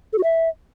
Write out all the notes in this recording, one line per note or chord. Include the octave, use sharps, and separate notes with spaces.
A4
F#4
E5